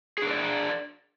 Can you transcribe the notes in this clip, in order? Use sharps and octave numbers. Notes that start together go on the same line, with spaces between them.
D4 G#4 A#4 D5